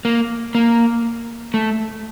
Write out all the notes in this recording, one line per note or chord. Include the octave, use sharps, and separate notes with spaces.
A#3
A#3
A3